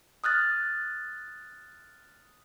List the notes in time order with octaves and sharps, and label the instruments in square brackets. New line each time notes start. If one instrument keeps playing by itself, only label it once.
[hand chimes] D#6 F6 F#6 A6